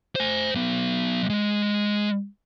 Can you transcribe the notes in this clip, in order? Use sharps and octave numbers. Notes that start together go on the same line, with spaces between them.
C5 G#5
F#3 B3
G#3